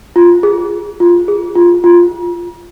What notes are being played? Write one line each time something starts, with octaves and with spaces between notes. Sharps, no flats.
F4
G#4
F4
G#4
F4
F4